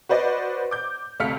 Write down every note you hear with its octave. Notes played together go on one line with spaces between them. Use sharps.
F#4 B4 C5 D5 D#5
D6 G6
D2 C3 F5 F6 B6 C#7